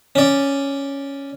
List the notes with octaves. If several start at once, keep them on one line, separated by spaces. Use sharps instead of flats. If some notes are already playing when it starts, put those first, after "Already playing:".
C#4 D5